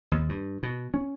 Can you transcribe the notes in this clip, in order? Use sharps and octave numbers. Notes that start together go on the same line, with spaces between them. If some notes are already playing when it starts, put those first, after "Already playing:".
D#2
G2
B2
C#4